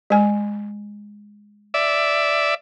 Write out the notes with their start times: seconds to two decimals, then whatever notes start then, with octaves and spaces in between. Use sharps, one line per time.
0.10 G#3 G#5
1.74 D5 E5